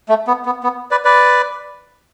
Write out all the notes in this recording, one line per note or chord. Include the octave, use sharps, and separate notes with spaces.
A3
B3
B3
B3
B4 D5
B4 D5